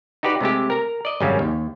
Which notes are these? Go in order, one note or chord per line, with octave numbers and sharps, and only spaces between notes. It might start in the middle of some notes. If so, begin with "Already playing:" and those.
D#4 F#4 G4 B4 D5
C3 G#3 A3 G4
A#4 A#5
D5 D#5
G#1 F#2 C#3 G3 C#4 F5
D#2